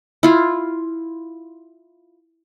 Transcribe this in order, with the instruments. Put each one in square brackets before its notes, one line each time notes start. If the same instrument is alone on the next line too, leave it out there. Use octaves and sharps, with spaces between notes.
[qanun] E4 F4